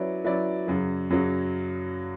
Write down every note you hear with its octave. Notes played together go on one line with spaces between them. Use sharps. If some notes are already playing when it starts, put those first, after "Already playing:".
Already playing: F#3 C#4 E4 B4 D5
F#3 C#4 E4 B4 D5
F#2 C#3 F#3
F#2 C#3 F#3